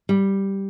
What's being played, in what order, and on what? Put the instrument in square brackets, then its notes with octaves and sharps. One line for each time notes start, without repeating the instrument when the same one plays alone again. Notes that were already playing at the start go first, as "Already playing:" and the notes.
[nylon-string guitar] G3